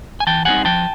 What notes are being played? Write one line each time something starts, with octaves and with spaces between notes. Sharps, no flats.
G#5
E3 G5 A5
G3 C4 D#4 F#5 G#5
F3 G5 A5